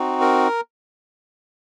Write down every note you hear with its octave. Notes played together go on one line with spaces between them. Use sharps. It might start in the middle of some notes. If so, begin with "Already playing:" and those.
Already playing: C4 D#4 F#4
A#4